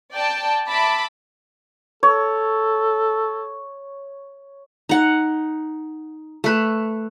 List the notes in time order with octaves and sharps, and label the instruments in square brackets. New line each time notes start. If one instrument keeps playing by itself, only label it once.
[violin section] D5 G5 A5
E5 A5 B5 D6
[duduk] A4 [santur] C#5
[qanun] D#4 F#5
A3 B4